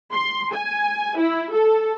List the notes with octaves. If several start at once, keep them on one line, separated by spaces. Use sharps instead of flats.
C6
G#5
E4
A4